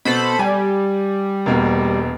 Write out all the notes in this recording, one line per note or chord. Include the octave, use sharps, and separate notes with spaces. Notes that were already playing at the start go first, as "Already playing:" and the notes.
B2 A4 C5 B5
G3 G#5
E1 B2 A#3